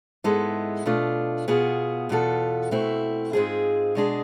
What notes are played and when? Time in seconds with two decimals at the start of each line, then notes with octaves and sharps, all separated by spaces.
0.24 G#2 G#3 B3 E4 A4
0.86 B2 A3 D4 F4
1.48 B2 B3 F4 G#4
2.09 E2 B2 B3 F4 A4
2.71 B2 A3 C4 E4
3.33 G#2 G#3 C4 F4 G#4
3.95 B2 G#3 D4 G#4